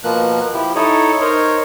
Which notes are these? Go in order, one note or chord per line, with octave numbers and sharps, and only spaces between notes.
B2 F3 A#3 F#6
F3 E4 G4
D#4 E4 A4 C#5 D#5
D#4 A#4 C5 C#5